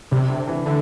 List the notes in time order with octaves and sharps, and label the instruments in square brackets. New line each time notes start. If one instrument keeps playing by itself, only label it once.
[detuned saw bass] C3 [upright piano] G3
[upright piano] D3
E3
[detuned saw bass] D3 [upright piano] A3